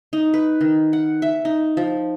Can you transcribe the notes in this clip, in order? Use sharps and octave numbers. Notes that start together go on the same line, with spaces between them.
D#4
B4
D#3
F#5
E5
D#4
F3